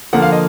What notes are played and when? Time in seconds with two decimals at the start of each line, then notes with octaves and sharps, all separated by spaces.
0.13 D3 F3 A#3 F#5
0.22 F5
0.32 D#5